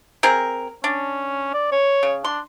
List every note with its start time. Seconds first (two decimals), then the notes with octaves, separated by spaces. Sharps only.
0.23 C4 G#4 A#4
0.84 C#4 D4
1.54 D5
1.72 C#5
2.03 C#3
2.24 D4 C6